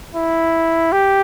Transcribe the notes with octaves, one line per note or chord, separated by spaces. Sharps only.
E4
G4